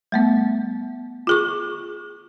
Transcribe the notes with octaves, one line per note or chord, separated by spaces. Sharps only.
G3 A3 B3
F4 G#4 C#6